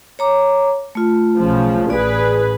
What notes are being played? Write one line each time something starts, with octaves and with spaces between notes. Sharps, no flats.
C#5 A#5 D6
A3 F4
B1 C#3 F3
A1 G#4 B4 D5